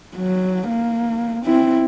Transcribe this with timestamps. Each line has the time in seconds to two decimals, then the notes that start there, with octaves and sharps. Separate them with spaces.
0.16 F#3
0.67 A#3
1.45 C4 E4